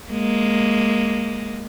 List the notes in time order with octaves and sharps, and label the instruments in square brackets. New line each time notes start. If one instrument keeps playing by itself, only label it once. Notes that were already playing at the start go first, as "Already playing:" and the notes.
[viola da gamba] G#3 A#3